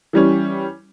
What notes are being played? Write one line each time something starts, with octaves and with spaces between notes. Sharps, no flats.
E3 G3 C#4